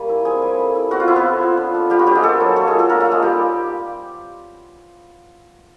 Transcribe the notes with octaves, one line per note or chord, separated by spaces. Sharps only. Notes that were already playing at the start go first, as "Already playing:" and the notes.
Already playing: G3 A#3 C#5 G#5
E4
C4 G#4 G#5
G3
A3
E4
C4 F#4 F#5
F4 F5
A3 E4 E5
B3 B4
A3
F4
D4
A3
G3 F4 G4
F#4
G3 D4 G4
G#3 G#4
A3 A#3 A4
F#3
A3 A#3 A4
G#3 G#4
F4
A3 A4
A#3 D4 A#4
A3 A4
A#3
G#3 G#4
G3 D#4 G4